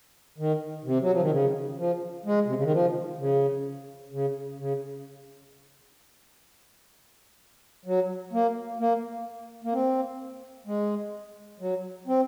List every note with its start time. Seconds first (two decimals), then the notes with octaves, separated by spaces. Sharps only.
0.38 D#3
0.84 C3
1.02 F#3
1.11 F3
1.21 D#3
1.31 C#3
1.78 F3
2.25 G#3
2.46 C3
2.55 C#3
2.64 D#3
2.72 F3
3.18 C#3
4.12 C#3
4.59 C#3
7.86 F#3
8.33 A#3
8.79 A#3
9.64 A#3
9.73 C4
10.67 G#3
11.60 F#3
12.07 C4